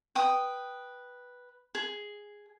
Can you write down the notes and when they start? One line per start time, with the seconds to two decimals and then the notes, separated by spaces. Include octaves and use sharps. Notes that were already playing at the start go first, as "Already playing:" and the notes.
0.15 B4 G5 D#6
1.75 G#4